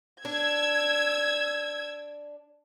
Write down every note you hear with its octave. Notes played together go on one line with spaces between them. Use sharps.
D4 E6 G#6